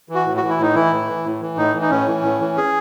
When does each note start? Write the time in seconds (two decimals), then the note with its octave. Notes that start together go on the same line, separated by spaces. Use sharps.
0.09 E3
0.15 F#4
0.26 A2
0.37 F#4
0.42 E3
0.49 E4
0.59 A2 D#4
0.75 E3 E4
0.92 A2
1.08 E3
1.25 A2
1.42 E3
1.58 A2 D#4
1.74 E3
1.82 D#4
1.90 A2 C#4
2.07 E3
2.23 A2
2.40 E3
2.57 G#4